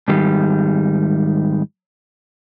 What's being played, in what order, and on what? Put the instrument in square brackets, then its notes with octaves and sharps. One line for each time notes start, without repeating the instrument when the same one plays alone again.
[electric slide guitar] G#2 D#3 G3